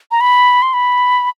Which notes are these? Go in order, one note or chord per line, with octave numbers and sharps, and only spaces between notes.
A#5
B5
C6
B5